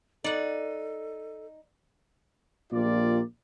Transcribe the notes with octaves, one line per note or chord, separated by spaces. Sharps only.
D#4 A4 D5 F#5
A#1 A#2 F4 G4 A#4 D5